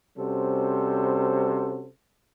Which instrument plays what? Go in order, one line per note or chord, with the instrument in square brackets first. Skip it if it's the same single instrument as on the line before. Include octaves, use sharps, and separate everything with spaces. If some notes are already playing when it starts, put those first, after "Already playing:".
[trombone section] C3 G3 C#4 F#4 A4 C5